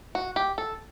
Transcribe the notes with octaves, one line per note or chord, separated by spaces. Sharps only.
F#4
G4
A4